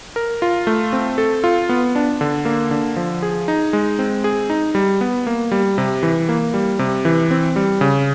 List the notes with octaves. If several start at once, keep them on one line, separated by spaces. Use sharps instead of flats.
A#4
F4
A3
C4
A4
F4
B3
D4
D3
A#3
D3
F3
G#4
D#4
G#3
C4
G#4
D#4
G3
B3
A#3
G3
C3
E3
A#3
G3
C3
E3
C4
G3
C#3